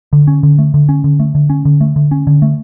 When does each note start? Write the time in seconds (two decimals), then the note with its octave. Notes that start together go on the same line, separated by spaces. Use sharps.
0.13 D3
0.27 C#4
0.43 D3
0.59 A3
0.74 D3
0.89 C#4
1.04 D3
1.20 A3
1.35 D3
1.50 C#4
1.65 D3
1.81 A3
1.96 D3
2.11 C#4
2.27 D3
2.42 A3